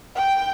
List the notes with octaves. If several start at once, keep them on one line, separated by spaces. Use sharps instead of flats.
G5